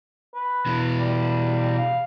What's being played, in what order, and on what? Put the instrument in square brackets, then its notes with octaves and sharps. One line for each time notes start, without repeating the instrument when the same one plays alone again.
[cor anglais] B4
[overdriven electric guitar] B2 E3
[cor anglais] G3
F5